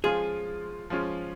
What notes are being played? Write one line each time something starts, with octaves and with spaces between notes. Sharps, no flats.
F3 G#3 C#4 F4 G#4
F3 G#3 C#4 F4